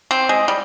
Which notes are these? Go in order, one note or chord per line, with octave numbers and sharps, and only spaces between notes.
C4
G#3
G3